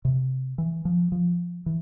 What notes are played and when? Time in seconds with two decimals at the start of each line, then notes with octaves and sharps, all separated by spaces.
0.05 C3
0.58 E3
0.85 F3
1.12 F3
1.66 E3